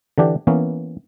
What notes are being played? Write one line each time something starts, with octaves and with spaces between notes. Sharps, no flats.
D3 E3 D4 G4
E3 A#3 B3 C#4